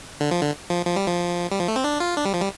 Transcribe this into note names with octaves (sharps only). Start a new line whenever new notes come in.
D3
F3
D3
F3
F3
G3
F3
G3
F3
A3
C4
D4
F4
D4
G3
F3
G3